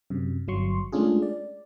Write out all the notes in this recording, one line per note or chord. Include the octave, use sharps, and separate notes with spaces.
F#2 C3
G1 F#3 C6 C#6
G#3 A3 C#4 D4 F4 G#4
D5